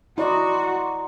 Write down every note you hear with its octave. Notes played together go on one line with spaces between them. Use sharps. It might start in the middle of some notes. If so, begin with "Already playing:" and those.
E4 F#4 D5 D#5 F#5 A#5 C6